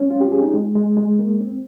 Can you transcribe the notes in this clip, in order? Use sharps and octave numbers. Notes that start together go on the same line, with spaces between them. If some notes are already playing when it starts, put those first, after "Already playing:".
Already playing: C4 C#4
F4
G4
G#4
D#4
G#3
G#3
G#3
A#3
C4